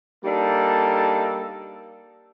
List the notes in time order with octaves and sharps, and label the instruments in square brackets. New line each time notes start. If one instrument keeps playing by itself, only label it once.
[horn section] G3 A#3 D4 D#4 A4